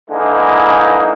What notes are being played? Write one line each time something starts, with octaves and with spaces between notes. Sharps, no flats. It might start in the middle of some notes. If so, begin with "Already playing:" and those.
D3 E3 G#3 A#3 D#4